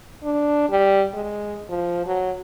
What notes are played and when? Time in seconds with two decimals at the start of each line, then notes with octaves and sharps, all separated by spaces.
0.23 D4
0.69 G3
1.13 G#3
1.69 F3
2.06 F#3